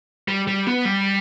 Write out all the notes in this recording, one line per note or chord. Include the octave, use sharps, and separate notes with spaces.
G3
G3
B3
G3